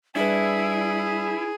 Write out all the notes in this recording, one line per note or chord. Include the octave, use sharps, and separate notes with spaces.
G3 D4 E4 G#4 B4